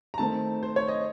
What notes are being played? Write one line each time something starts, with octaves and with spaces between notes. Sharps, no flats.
A#5
D#3 A3 C4 A5
C5
C#5
D#5